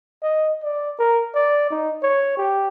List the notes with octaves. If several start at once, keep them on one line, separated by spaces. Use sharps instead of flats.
D#5
D5
A#4
D5
D#4
C#5
G4